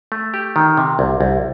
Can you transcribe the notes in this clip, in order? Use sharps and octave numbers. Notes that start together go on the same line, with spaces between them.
A3
G4
D#3
C3
C2
C2